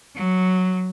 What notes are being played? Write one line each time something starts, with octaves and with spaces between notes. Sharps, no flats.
F#3